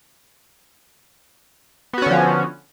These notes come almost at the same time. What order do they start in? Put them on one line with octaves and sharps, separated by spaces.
B3 F#4 C#4 D3 F3